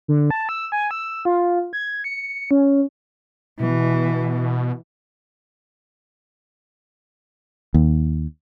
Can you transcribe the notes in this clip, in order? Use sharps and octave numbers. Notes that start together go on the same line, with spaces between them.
D3
A5
E6
G#5
E6
F4
G#6
C#7
C#4
B2 E3
D#2